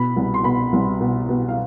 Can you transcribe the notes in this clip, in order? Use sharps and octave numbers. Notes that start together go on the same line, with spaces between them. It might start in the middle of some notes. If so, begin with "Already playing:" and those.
Already playing: B2 B5
C2
C6
B2 B5
C2
B2
B2
F5